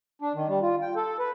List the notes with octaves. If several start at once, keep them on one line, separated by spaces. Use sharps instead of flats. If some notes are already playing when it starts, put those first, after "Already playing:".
D4
D#3
G3
F4
G5
A4
B4